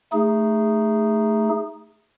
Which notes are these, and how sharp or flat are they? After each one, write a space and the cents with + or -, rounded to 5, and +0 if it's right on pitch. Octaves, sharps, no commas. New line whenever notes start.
A3 +0 D#4 +0 G#4 -15